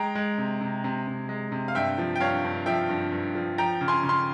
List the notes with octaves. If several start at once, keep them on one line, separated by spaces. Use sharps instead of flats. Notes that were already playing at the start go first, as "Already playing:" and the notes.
Already playing: G#3 G5 A#5
G#3
C3
C3
C3
C3
G#3
C3
F5
G2 E5 G5
F3
G5
G2 C#5 F5
G2
F3 E5 G5
G2
G2
F3
F3 G5 A#5
C#3
G#5 C6
C#3
C6